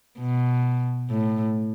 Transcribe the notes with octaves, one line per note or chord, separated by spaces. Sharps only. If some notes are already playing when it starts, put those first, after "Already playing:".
B2
A2